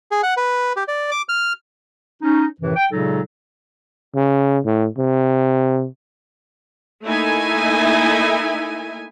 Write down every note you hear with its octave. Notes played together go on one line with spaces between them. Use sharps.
G#4
F#5
B4
G4
D5
D6
F6
C#4 D#4
F#2 A2 C3 D#3 E3
G5
A#2 C#3 F#3 G#3 D#4 A4
C#3
A2
C3
A3 A#3 D#4 E4 E5 G#5